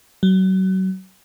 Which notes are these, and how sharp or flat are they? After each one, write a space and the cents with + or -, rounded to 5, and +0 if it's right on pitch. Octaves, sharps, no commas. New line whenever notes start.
F#3 +30